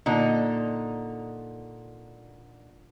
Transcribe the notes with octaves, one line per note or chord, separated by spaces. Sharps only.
A#2 D3 D#4